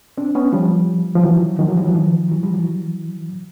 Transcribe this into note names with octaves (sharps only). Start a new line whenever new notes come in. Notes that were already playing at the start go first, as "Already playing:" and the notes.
C4 D4
B3 C#4
F3 G3
F3
E3 F#3
D#3 F3
E3 F#3
F3 G3
E3 F#3
D#3 F3
E3 F#3
F3 G3
E3 F#3